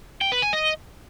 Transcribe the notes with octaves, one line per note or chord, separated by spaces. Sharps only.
G5
B4
G#5
D#5